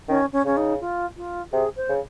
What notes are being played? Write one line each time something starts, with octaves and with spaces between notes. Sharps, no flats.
D#3 C#4
C#4
C#3 C#4
D#4
F4
F4
C3 G#4
C5
C#3